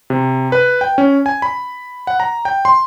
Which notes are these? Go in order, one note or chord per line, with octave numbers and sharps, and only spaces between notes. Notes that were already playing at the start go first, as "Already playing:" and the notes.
C3
B4
G5
C#4
G#5
B5
F#5
A#5
G5
C6